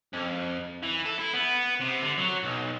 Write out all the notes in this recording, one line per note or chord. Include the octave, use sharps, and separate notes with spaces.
F2
E3
A4
E4
B3
C3
D3
F#3
B1